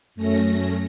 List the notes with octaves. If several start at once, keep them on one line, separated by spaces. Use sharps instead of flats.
F#2 A3 C#4 A#6